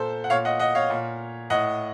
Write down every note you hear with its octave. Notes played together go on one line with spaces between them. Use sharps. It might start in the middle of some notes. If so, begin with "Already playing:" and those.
Already playing: A#2 A4 C5
F#5
A#2 C#5 F5
D#5 F#5
D#5 F#5
C#5 F5
A#2
A2 D#5 F#5